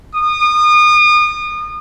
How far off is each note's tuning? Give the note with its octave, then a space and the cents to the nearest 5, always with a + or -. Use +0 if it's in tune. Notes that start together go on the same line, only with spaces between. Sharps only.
D#6 -35